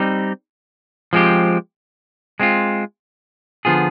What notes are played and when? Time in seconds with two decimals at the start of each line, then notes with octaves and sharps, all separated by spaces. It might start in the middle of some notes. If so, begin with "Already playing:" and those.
Already playing: G3 C4 D#4
1.13 F3 G#3 C4 G4
2.40 G#3 C4 F4
3.65 D3 F3 B3 F4 G#4